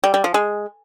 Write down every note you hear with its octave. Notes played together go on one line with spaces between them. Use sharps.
G3
G3
F3
G#3